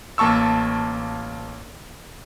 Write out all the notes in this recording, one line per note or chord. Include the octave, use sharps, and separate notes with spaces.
A1 A#3 A5 C#6 E6